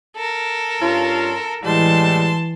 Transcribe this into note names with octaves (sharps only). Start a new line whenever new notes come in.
A4 A#4
G2 C#4 F4
A2 E3 G3 G#3 A5 C6